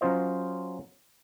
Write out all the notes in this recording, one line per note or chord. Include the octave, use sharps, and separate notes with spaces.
F#3 C#4 F4 C5 D#5